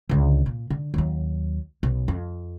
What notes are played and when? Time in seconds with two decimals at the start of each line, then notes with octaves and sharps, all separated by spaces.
0.09 C#2 D3
0.46 A#2
0.70 D3
0.94 D#2 F#3
1.83 B1
2.08 F2